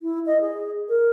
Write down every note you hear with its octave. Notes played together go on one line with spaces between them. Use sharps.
E4
D#5
G#4
A#4